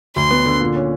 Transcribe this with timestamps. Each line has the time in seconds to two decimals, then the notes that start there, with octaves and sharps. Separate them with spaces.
0.16 D2 C6
0.31 B3
0.46 D3
0.60 A#2
0.76 C#4